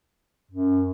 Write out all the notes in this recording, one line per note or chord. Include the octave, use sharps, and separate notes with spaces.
F#2